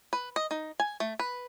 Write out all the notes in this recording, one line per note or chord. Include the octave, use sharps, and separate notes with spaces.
B4
D#5
D#4
G#5
A3
B4